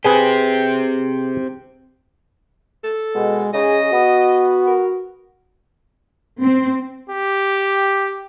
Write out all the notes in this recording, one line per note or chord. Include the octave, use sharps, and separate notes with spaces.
C4 G4 G#4 B4
A4
B2 G#3
C#3 G#4 D#5
B3 F#4
A#4
C4
G4